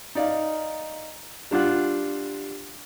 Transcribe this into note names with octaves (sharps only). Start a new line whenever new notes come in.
D#4 D5 F5
G3 D4 F4 F#5 F#6